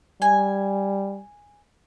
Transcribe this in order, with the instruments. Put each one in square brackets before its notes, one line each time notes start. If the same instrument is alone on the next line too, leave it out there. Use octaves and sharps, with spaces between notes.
[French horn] G3 [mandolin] G#5